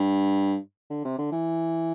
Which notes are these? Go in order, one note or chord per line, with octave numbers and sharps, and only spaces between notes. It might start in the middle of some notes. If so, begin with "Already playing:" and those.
Already playing: G2
D3
C3
D3
E3